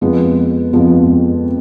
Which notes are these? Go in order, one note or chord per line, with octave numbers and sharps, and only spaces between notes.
F2 F3 G#3 B3
F2 F3 G#3 B3